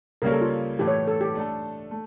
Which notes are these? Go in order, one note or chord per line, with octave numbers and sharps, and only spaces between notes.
C#3 G3 A#3 C#4 A#4
A4
F4
A2 E3 A3 G4
C#5
A4
G4
A3 D4 A4
A3